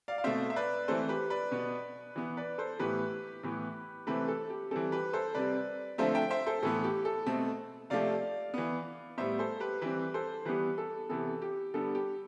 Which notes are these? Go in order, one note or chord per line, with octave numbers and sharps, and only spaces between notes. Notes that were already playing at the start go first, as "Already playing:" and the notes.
D5 F5
F5
B2 A3 C4 C5 E5
E5
B4 D5
E3 A3 C4 A4 C5
G4 B4
B4 D5
B2 B3
E3 B3
B4 D5
A4 C5
A2 E3 B3 G4 B4
A2 E3 B3
C3 E3 A3 C4 G4 B4
A4
G4
E3 G3 C4 A4
G4 B4
A4 C5
C3 G3 C4 B4 D5
D3 F3 A3 C4 C5 E5
E5 G5
C5 E5
A4 C5
A2 E3 B3 A4
G4
A4
B2 A3 C4
C3 F3 A3 C4 D5 F5
E3 B3
A2 G3 B3 C5 E5
A4 C5
G4 B4
E3 G3 C4 G4 B4
A4 C5
E3 G3 B3 G4 B4
A4
C3 E3 B3 A4
G4
D3 G3 B3 A4
G4